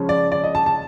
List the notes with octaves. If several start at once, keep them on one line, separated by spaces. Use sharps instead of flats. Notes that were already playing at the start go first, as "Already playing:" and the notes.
Already playing: C#3 F3 G#3 C#4
D5
D5
D#5
A5
A5